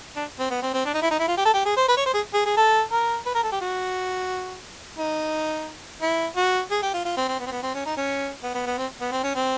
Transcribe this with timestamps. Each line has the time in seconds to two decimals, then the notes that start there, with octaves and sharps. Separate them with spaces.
0.16 D4
0.39 C4
0.50 B3
0.62 C4
0.74 C4
0.85 D4
0.94 D#4
1.02 E4
1.11 D#4
1.19 E4
1.28 F4
1.37 G4
1.45 A4
1.54 G4
1.65 G#4
1.77 C5
1.88 B4
1.97 C#5
2.06 C5
2.14 G#4
2.34 G#4
2.46 G#4
2.57 A4
2.92 A#4
3.26 B4
3.35 A#4
3.43 A4
3.52 G4
3.61 F#4
4.98 D#4
6.02 E4
6.36 F#4
6.71 G#4
6.82 G4
6.94 F4
7.05 F4
7.17 C4
7.28 C4
7.40 B3
7.46 C4
7.51 B3
7.63 C4
7.74 C#4
7.86 D#4
7.97 C#4
8.43 B3
8.55 B3
8.66 B3
8.78 C4
9.01 B3
9.12 C4
9.24 C#4
9.35 C4